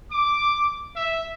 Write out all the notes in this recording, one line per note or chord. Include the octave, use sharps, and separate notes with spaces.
D6
E5